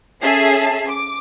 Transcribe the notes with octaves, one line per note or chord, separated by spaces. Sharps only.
C#4 G#4 A4 E5 A5 C7
D6